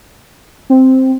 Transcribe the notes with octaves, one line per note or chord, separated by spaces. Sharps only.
C4